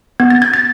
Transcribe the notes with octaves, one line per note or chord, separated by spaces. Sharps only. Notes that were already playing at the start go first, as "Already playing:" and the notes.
B3 G#6
A6
G#6
A6